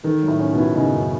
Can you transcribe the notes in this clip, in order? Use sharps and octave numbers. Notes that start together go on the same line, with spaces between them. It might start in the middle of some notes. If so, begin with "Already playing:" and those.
D#3 A4
F#3
A2
C#4
B2
E4
C#3 D#4
F#2